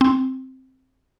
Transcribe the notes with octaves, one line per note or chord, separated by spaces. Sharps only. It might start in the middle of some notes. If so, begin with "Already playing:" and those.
C4